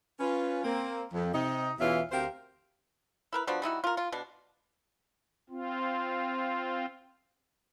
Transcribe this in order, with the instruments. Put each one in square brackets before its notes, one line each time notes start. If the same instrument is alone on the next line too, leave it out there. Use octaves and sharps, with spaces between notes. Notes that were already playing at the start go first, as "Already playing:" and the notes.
[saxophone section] C#4 F4 B4
A#3 C4
F2
C3 D#4
E2 B2 E3 C#4 F4 E5
D2 C4 G4 A#4 C5 F5
[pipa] E4 A#4 B4
F3 B3 D4 F#4
G3 D#4 E4 F#4
F4 A#4
F4
B2 D4
[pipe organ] C4 F4